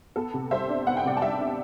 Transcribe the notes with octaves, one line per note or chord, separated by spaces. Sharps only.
B3 A4
C3
G3 C5 E5
D4
B3 F#5
G5
C3 D5 F#5
A5
G3 E5 G5
D4